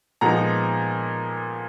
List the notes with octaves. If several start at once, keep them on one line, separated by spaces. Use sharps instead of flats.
A#2 F3 G#3 B3 D#4 F#5 A#5